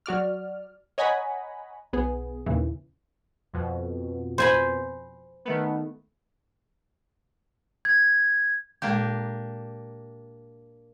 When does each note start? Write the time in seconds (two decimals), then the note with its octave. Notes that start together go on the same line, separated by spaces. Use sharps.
0.06 F#3 F#4 D5 F6
0.98 C#5 D#5 F#5 G#5 A#5 B5
1.93 B1 B3 G#4
2.46 D#2 A#2 C#3 E3
3.53 F2 B2
4.38 C5 G#5 B5
5.45 D#3 A3 B3
7.85 G#6
8.82 A#2 G#3 A#3 D4 G4 G6